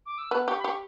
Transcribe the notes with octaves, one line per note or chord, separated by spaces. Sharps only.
D6
E6
B3 F#6
G4 C#6
B5
G4 C#6